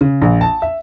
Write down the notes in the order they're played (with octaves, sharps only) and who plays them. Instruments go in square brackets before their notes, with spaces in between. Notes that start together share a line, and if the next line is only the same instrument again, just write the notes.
[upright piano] C#3
A#1
A5
E5